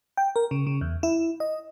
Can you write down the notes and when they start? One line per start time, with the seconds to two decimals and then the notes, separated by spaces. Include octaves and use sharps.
0.17 G5
0.36 A#4
0.51 C#3
0.67 C#3
0.81 E2
1.03 E4
1.40 D#5